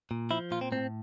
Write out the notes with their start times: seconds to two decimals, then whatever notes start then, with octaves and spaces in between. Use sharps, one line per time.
0.11 A#2
0.31 F3 E4
0.51 A#2 F4
0.61 C4
0.72 A2 C4